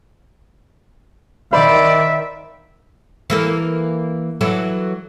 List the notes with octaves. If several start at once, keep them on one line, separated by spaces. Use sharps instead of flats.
D#3 C5 D5 E5 F5 B5
E3 A#3 A4
E3 F#3 A4